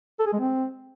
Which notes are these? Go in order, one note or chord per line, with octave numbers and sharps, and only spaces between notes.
A4
G#4
G#3
C4